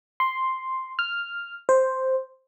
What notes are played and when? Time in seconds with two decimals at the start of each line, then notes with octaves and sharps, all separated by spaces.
0.20 C6
0.99 F6
1.69 C5